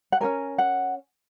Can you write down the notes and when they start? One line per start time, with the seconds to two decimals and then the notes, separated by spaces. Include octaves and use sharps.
0.12 F#5
0.21 C#4 F#4 A#4 G#5
0.58 F#5